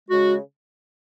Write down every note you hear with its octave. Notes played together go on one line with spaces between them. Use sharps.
C#3 G#3 F#4